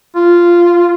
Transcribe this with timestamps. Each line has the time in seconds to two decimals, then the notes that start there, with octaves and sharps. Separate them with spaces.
0.15 F4